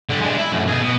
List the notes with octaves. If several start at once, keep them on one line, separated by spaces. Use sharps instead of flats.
D3 G3
G#3 D4
E4
F#2 A2
B1 G#4
B2